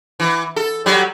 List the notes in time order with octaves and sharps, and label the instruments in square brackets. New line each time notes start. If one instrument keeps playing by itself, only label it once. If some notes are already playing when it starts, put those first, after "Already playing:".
[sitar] E3
A4
F#3 G3